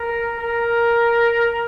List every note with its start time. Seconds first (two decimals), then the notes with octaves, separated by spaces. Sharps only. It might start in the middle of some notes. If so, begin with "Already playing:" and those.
Already playing: A#4
0.39 A#4